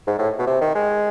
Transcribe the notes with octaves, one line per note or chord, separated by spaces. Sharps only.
G#2
A2
B2
C3
D#3
G#3